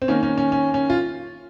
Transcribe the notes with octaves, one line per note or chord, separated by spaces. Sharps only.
C4
D#3 A#3 C#4
C#4
C#4
C#4
C#4
F4